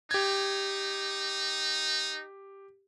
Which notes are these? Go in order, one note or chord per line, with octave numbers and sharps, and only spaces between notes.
D#4 G4 G#6